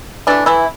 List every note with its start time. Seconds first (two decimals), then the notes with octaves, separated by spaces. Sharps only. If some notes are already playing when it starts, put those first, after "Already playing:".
0.27 E3 A3 D4
0.46 E3 E4